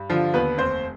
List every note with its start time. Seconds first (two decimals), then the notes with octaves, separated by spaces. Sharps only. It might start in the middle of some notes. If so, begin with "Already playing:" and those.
Already playing: G2
0.10 D3 F3 F4
0.33 D#2 B3 B4
0.58 F1 C4 C5